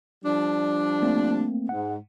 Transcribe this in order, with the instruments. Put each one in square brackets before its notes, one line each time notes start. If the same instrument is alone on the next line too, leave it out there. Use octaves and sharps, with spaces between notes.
[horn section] F3 G3 D4
[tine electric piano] A3 A#3 C4
[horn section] G#2 [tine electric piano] F#5